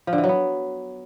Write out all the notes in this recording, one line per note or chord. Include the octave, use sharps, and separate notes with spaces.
F3
D3
E3
F#3
B3